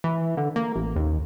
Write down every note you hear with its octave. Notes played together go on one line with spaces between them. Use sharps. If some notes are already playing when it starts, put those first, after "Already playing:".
E3
D3
A#3
A1
D#2